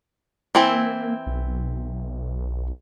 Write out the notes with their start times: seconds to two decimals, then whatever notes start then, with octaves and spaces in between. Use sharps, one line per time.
0.55 E3 A#3 C4 E4
1.26 B1